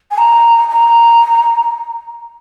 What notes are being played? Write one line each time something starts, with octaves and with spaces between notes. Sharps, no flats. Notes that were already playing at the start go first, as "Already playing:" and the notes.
G#5
A#5
A#5